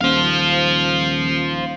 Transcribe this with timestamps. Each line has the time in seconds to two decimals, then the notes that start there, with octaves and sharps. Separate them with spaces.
0.01 D#1 C5 F5